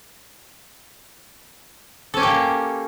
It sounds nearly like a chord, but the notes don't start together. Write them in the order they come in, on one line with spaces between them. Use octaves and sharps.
A4 C#4 G4 A#3